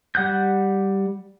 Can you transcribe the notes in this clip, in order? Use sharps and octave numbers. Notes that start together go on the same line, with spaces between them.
G3 F#5 F#6 G6